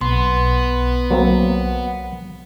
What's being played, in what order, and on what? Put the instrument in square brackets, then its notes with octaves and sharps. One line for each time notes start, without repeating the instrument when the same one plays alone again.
[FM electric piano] B1 [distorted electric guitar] B3 [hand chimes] C6
[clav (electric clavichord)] F#3 A#3 C4